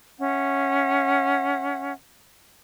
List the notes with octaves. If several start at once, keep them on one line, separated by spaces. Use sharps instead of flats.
C#4 E5 F#5